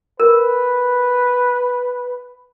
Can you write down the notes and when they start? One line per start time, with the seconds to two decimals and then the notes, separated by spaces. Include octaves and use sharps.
0.20 A#4 B4